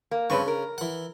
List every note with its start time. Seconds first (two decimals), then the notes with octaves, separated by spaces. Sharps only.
0.11 A#3
0.30 G2 C#3 C4 B4 C#6
0.48 A#4
0.78 E3 F#5